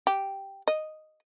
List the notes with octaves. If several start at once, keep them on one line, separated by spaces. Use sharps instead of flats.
G4
D#5